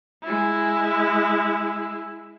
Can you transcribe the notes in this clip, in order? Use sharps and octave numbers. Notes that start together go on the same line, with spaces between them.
G#3 E4